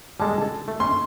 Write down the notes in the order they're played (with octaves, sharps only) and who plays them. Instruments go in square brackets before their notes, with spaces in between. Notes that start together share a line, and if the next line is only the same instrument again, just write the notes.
[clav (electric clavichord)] G3 G#3 A4 [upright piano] A5
[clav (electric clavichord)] A4
A3
[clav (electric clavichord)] C#4 [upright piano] C6